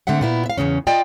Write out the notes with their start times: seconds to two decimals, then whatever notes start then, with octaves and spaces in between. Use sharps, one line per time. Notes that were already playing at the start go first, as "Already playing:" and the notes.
0.07 D3 A3 C4 E5 F#5
0.21 A#2 B3 E4
0.46 E5 F5
0.58 E2 A#2 C#3 C#4
0.87 F4 D5 D#5 G5 A5